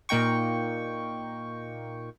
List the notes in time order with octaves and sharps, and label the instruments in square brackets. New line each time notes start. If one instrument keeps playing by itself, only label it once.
[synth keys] A#2 A#3 D#4 G5 C#6